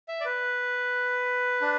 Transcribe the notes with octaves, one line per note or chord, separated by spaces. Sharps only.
E5
D5
B4
D4